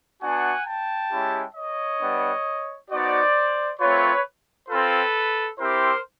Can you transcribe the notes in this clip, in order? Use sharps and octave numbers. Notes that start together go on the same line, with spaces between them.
B3 D4 F#4 F#5 G#5
G5 A5
G#3 C#4 E4 G4
C#5 D#5
G3 B3 D4
B3 D#4 F#4 C5 D5
A3 C4 F4 B4 C#5
C4 F4 A4 B4
C4 E4 G4 A#4 C5